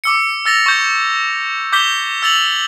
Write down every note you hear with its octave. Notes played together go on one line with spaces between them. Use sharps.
D6 E6 C#7
E6 A6 A#6 F7
C#6 G6
D6 G6 B6 G7
E6 A6 F7 F#7